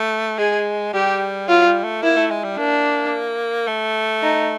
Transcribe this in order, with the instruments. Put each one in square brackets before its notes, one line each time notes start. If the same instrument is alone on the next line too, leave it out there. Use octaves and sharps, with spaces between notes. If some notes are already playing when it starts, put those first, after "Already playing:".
Already playing: [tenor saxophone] A3
[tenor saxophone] G#3 [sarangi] G#4
[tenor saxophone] G3 [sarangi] G4
[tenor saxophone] F#3 [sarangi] F4
[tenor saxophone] G3
A3
[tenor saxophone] A#3 [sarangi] E4
[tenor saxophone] A3
G#3
G3
[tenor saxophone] A#3 [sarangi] D4
[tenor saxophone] A3
[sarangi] D#4